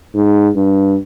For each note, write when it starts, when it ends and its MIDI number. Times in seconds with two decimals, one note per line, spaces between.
0.14 0.49 44
0.56 0.97 43